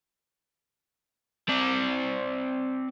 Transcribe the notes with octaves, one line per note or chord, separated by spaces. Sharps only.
C4 D5